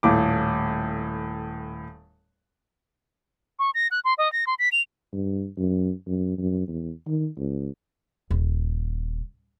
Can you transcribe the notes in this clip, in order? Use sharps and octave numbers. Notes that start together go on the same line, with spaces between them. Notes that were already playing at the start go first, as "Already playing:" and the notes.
D#1 A2 D6
C#6
A#6
F#6
C6
D#5
A#6
C6
B6
F7
G2
F#2
F#2
F#2
E2
D#3
C#2
D#1